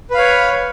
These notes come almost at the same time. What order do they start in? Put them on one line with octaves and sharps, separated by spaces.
B4 F5 C#5